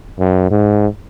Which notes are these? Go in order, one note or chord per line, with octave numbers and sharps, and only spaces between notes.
F#2
G#2